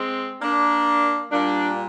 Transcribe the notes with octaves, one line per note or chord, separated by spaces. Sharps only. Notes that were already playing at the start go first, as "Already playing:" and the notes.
Already playing: G#3 C4
A#3 D4
A#2 G3 A#3 D4